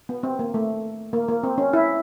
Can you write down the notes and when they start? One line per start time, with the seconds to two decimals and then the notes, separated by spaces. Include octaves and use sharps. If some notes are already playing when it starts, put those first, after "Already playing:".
0.09 B3
0.23 C4
0.39 A#3
0.54 A3
1.13 A#3
1.28 A#3
1.43 C4
1.58 C#4
1.73 E4